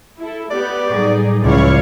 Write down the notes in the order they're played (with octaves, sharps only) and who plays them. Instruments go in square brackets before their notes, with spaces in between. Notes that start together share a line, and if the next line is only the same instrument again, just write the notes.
[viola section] E4 A4
[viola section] B3 G4 [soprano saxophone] D5
[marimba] A2 F#3 G3 [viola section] D#4 G#4
[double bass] C#2 [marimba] F3 [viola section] E4 C#5 F5 [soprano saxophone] D5